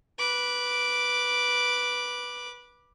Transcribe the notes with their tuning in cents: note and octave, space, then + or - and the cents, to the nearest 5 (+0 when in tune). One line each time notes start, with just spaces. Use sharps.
B4 -10 D6 +0